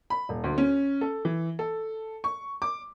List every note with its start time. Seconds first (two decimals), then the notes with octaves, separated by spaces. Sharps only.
0.10 B5
0.29 D#1
0.44 D2
0.58 C#4
1.01 A4
1.25 E3
1.59 A4
2.24 C#6
2.62 D6